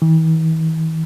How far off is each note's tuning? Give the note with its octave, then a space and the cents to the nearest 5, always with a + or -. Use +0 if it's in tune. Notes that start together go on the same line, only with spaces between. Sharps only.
E3 -45